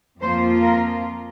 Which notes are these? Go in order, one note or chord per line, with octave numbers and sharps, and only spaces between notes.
F2 F3 A#3 F4 C5
A#4